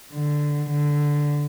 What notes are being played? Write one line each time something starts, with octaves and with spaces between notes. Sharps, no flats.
D3
D3